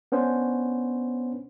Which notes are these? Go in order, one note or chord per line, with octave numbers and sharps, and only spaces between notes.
B3 C#4 D4 C5